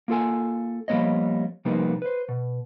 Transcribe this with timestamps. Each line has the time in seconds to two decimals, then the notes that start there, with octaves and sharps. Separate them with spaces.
0.08 A#3 F4 A4 G#5
0.88 F3 G3 A#3 B3 C#5 D#5
1.65 C3 F3 G3 A#3 B3 D#4
2.02 B4 C5
2.29 B2